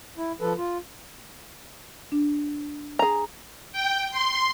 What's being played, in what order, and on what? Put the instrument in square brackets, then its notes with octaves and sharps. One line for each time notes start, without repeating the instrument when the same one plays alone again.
[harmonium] E4
F3 A4 B4
F4
[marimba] D4
[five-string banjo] G#4 A#5
[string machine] G5
C6